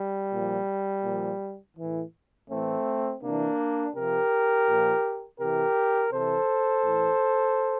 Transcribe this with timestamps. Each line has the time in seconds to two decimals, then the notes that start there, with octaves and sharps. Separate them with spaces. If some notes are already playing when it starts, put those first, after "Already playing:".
Already playing: G3
0.32 A#2 F3
1.04 A#2 F3
1.77 A2 E3
2.49 A2 E3 A3 C4
3.22 C3 E3 A#3 D4
3.94 C3 F3 G4 A#4
4.67 A#2 F3
5.39 C3 E3 G4 A#4
6.11 C3 E3 A4 C5
6.84 A2 E3